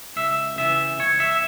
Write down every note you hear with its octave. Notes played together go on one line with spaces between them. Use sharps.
C#2 E5
C#3 E3 E5
C#2 C#5
E5